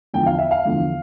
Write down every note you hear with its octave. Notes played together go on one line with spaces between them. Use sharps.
E2 D3 F3 G5
F5
E5
F5
E2 D3 F3